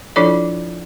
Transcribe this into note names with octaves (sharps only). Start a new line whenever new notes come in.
F3 D4 E4 F4 A4 D5